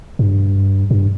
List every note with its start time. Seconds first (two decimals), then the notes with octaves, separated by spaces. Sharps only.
0.19 G2
0.91 G2